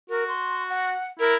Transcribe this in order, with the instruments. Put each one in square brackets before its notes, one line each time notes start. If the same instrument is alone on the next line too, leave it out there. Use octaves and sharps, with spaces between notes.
[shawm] F#4 [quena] A#4
[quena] C6
F#5
[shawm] E4 [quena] A#4